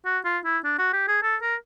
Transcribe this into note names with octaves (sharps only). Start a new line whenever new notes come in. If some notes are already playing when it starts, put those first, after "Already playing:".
F#4
F4
E4
D4
F#4
G4
G#4
A4
A#4